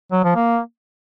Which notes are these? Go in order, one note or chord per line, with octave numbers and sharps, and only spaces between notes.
F#3
F3
A#3